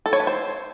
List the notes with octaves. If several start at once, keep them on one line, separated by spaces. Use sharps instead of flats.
A4
C#5
B4
C5